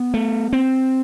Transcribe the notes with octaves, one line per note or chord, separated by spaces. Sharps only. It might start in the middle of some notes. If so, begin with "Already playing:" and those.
Already playing: B3
A3
C4